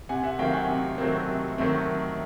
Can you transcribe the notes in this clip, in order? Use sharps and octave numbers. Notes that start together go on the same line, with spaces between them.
C3 F#5 G#5
E5 F#5
D#3 F#3 A3 C4 F5 G5
F#5 G#5
C3
D#3 F#3 A3 C4
C3
D#3 F#3 A3 C4